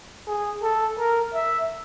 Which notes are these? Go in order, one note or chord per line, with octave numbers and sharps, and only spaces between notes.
G#4
A4
A#4
E5